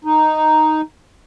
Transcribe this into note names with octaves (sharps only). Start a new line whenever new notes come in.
D#4